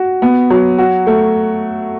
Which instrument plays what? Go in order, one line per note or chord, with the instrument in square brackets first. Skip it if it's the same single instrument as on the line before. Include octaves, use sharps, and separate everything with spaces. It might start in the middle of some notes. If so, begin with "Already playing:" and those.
Already playing: [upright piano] F#4
B3
F#3
F#4
A3